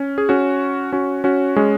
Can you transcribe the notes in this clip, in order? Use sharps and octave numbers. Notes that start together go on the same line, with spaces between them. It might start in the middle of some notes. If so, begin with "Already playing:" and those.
Already playing: C#4
G#4
C#4 F#4
C#4 F#4
C#4 F#4
G#3 C#4